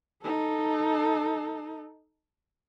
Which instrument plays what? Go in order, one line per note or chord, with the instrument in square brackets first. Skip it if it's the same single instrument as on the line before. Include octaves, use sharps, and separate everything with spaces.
[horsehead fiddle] D#4 A4